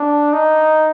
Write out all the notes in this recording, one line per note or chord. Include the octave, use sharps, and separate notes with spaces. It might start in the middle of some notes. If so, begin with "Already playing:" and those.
Already playing: D4
D#4